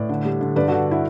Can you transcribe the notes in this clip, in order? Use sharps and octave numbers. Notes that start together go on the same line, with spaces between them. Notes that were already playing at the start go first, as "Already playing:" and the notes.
Already playing: A2 B4 D5
D3
G3
D3
G2 B4 D5
F#4 A4
D3
E4